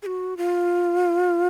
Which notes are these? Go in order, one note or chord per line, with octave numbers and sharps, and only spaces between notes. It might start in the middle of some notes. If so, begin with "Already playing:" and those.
G#4
F#4
F4